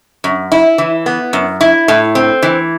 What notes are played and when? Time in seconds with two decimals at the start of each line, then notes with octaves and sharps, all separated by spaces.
0.24 F#2
0.52 E4
0.78 E3
1.06 B3
1.33 F#2
1.61 E4
1.88 A2
2.15 C4
2.43 E3